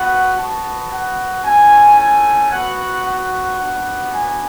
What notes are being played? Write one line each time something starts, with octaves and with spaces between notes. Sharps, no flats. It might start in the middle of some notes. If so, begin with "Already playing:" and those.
Already playing: B3 F#4 F#5
B3 F#4 A5
F#5
A3 C#4 E4 G#5
G#5
B3 F#4 F#5
F#5
B3 D4 F#4
G#5